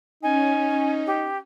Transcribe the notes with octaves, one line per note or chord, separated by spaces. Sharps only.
C#4 D#4 G#5
G4